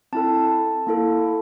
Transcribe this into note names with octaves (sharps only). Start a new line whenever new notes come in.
C4 E4 A4 A5
A#3 E4 A4